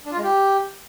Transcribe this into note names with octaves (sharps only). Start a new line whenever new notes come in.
D4
F4
G#3
G4